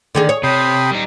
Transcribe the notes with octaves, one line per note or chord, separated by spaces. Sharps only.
D3 D#3 G#4
G#4 C#5
C3 G5 B5 D#6
G3 D#4